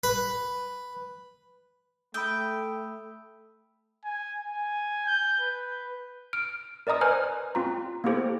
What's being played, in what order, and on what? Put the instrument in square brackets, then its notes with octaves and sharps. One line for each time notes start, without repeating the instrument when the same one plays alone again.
[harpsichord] B4
[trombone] A3 [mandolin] G5 [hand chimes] B5 D#6 E6
[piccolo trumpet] G#5
G#5
G6
B4
[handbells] F6 D7
A#4 D5 D#5 A#5 D#6
B4 C5 G#5 A#5 F6 F#6
C4 F4 A#5
A#3 B3 E4 G4 A4 C5